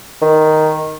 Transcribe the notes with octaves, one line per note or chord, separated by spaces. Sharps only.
D#3